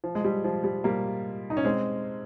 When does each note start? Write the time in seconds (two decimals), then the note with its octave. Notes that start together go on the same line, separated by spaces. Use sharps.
0.04 F3
0.15 G#3
0.25 G3
0.44 F3
0.64 G3
0.84 G3 A#3
1.50 D#4
1.57 C#4
1.65 G#3 C4